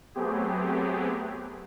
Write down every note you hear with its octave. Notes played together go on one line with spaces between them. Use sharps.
F#3 A3 B3 C4 G4 G#4